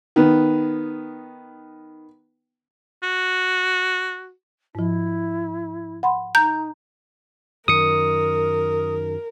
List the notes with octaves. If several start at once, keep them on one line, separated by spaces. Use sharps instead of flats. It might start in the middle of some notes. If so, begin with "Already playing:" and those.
D#3 B3
F#4
G#2 F3 E4
F#5 B5 C6
D#4 A#5 G6
F#2 D#3 A#4 D#6 C#7